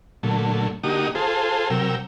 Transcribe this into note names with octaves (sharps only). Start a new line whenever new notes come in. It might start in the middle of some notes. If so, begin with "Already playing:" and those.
A#2 D3 F#3 A3
D3 A#3 D#4 F#4 G4 D#6
F4 G#4 A4 C5
C3 F#3 A#4 G5 E6